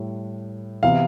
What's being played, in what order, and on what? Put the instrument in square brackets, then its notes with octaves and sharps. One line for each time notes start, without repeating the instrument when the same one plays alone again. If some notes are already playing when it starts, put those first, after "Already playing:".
Already playing: [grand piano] A2 G3
C3 E3 B3 F5